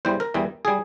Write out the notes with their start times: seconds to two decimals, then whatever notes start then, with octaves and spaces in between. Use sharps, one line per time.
0.05 E2 E3 G3 C5
0.20 A#4
0.34 E2 E3 G3
0.65 G3 G#4